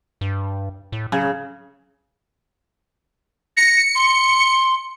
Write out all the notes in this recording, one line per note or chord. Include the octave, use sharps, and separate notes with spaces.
G2
A2
C#3 F#3
A#6 C#7
C6